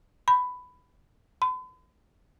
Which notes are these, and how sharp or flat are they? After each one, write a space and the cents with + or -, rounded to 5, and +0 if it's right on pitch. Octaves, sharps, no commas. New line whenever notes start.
B5 +15
B5 +45